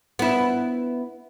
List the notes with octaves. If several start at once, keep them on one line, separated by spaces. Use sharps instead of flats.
B3 E4